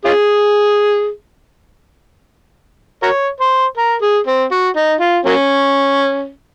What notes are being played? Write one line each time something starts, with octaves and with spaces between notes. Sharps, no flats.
C#4 F4 G#4
F#4 A#4 C#5
C5
A#4
G#4
C4
F#4
D#4
F4
F#3 A#3 C#4